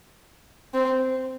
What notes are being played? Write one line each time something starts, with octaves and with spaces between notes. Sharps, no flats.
C4